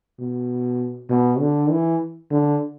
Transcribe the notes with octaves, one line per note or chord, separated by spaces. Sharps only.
B2
B2
D3
E3
D3